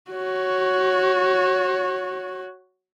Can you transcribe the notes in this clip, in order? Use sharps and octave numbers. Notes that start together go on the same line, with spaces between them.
F#4 C#5